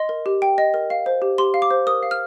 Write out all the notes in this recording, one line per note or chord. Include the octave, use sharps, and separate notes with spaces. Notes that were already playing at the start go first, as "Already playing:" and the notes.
Already playing: D#5 C6
A#4
G4
G5
D#5
A#4
F5
C5
G4
G4 C6
F5
D6
C5
A#4 D#6
F5
F6